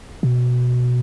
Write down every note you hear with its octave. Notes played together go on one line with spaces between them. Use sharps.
B2